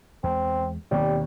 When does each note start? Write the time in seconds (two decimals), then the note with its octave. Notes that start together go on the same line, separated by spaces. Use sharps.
0.23 E2 G#3 C4
0.91 D#2 B2 G3 A#3 C4